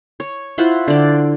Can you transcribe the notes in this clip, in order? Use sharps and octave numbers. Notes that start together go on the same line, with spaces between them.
C#5
E4 F4 C5 F#5
D3 D5